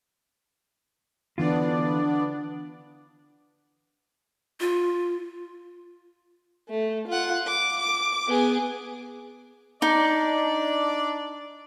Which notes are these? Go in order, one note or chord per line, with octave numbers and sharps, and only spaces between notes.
D3 E3 B3 D4 F4 D5
F4
A3
F4 F#5
D6
D6
B3 G#4
D4 D#4 D5